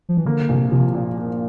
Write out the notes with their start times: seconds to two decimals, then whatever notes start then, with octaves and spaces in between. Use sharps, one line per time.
0.09 F3
0.17 E3
0.26 D3 A#3
0.49 A#1 C3
0.72 C3 F3
0.94 A#2
1.18 A#3